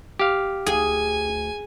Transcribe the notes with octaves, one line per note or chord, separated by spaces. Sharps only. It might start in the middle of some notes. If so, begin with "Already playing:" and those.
G4 F5
D2 G#4 G#5